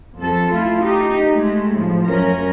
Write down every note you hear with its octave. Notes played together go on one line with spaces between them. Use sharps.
F2 A4
A3 E4 F4
D#4 G4
G#3 A3
A2 F3
F#2 C#4 A#4